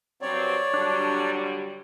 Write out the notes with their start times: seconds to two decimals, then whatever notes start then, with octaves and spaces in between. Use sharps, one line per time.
0.22 G2 F#3 C4 C#5 D5
0.74 D3 F#3 G3 D4